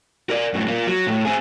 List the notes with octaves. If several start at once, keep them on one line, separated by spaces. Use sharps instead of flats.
A#4 D5
F#2 A2
A#3 F4
F#3
A2
C4 G#4